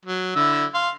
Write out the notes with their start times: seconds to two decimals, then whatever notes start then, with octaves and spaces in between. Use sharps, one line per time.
0.05 F#3
0.36 D3 E4 E6
0.74 F5 C6